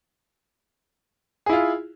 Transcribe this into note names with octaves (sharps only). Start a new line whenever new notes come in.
E4 F4 G#4